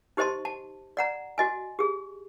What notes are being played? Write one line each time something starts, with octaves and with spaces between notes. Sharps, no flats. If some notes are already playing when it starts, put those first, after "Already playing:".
D#4 G4 C5 D#5 A5 C6
A5
D5 F#5 A#5
F#4 D#5 G#5
G4 G#4